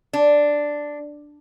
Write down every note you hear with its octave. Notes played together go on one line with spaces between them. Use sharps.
D4